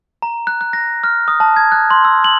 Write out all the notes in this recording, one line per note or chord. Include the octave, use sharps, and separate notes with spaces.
A#5
F#6
F#6
A#6
F6
D#6
A5
G#6
F#6
C6
E6
F#7